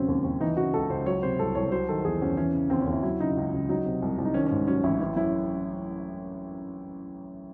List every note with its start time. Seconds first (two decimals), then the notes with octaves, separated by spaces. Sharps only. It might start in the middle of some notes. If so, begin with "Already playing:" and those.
Already playing: E1 C#3 F#3 C4 C#4
0.08 D#2
0.24 D#2
0.41 E3 D#4
0.57 C#3 F#4
0.74 C#2 A4
0.89 C#2 C5
1.06 F#3 C#5
1.23 C3 C5
1.39 C2 A4
1.55 C2 C#5
1.71 F#3 C5
1.89 D#3 A4
2.04 E2 G#4
2.22 E2 C#4
2.37 E3 C#4
2.54 C#3
2.70 D#2 C4
2.81 C#4
2.87 D#2
2.92 E4
3.03 F#3 E4
3.20 C#3 D#4
3.37 C#2
3.53 C#2
3.69 F#3 D#4
3.85 C3
4.02 C2
4.18 C2
4.25 D#4
4.34 D#3 C#4
4.46 C#4
4.51 G#2
4.68 F#3 C#4
4.84 A1 E4
5.00 E3 E4
5.16 F#2 E4